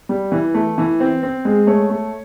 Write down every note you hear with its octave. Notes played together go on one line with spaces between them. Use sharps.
G3
E3
A3
E3
C4
C4
G#3
A3 C#5
A3